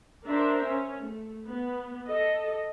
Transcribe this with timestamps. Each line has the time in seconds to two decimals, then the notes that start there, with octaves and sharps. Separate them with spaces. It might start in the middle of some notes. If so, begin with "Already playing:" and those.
0.25 D4 A#4 C5 E5
0.63 C#4
1.01 A3
1.45 B3
2.05 A4 D#5